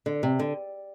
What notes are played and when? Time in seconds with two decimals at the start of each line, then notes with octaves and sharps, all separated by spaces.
0.06 D3
0.23 C3
0.39 D3